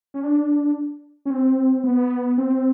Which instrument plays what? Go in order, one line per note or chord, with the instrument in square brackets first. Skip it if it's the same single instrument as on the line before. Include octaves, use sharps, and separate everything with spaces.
[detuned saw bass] C#4
D4
C#4
C4
B3
C4